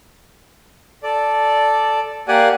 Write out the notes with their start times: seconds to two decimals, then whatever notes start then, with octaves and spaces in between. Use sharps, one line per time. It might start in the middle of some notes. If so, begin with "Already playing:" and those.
1.03 A4 D5
2.28 A#3 G4 D5 F#5 G#5